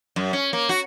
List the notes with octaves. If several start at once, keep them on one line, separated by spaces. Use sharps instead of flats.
F#2
C#4
A#3
F#4